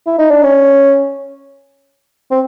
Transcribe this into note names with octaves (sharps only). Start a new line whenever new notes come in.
E4
D#4
D4
C#4
C4